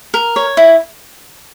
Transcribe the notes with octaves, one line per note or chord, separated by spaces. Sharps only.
A#4
C#5
E4